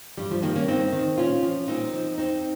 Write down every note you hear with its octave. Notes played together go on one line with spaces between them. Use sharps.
G2 G3
F3
D#3 G3 A#3
A#3 C#4
G2 C4 D#4
D#3
A#2 C#4 F4
F3
A#2 C4 D#4
F3
F2 C4 D#4